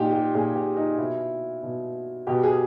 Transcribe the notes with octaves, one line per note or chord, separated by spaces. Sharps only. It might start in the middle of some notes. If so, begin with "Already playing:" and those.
Already playing: A#2 D#4 G4
G4
A#2 G#4
G4
D#4
B2 E4
B2
B2 G4
G#4